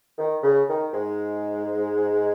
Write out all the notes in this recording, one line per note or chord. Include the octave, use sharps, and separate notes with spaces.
D#3
C#3
D#3
G#2 G#3